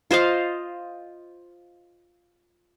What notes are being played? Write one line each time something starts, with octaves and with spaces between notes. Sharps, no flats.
F4 C5 D#5 F5